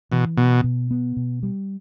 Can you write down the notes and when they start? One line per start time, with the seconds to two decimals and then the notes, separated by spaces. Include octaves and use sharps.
0.12 B2 E3
0.37 B2 B3
0.64 B2
0.91 B3
1.17 B2
1.43 G3